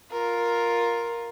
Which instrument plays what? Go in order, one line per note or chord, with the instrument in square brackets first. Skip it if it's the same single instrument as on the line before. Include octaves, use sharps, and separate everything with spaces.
[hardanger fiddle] F4 A#4